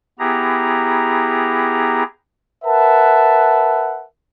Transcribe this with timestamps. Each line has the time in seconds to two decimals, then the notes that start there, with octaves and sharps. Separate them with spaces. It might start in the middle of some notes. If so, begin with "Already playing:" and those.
0.19 B3 E4 G4 G#4 A#5
2.65 A#4 B4 E5 F#5 A5